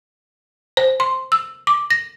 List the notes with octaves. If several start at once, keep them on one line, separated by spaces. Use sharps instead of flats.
C5
C6
E6
D6
A#6